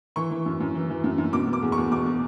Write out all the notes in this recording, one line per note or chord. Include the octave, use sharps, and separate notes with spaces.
E3 C#6
E3
F#2
F#2
E3
E3
F#2
F#2
B2 D6
B2
D6
E2
C#6
E2
B2 D6
B2